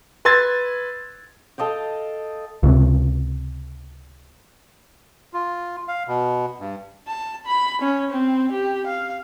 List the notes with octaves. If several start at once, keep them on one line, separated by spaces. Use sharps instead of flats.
B4 C6 E6 G#6 A6
A4 D#5 F5 G5
C#2 C3
F4
F5
B2
G2
A5
B5
C#4
C4
G4
F5